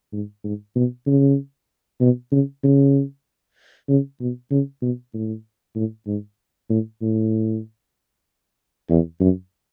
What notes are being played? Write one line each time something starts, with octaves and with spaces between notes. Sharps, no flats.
G#2
G#2
B2
C#3
B2
C#3
C#3
C#3
B2
C#3
B2
A2
A2
G#2
A2
A2
E2
F#2